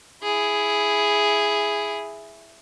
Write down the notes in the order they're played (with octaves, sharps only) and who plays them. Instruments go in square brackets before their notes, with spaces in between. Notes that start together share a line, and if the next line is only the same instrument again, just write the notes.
[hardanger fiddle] E4 G#4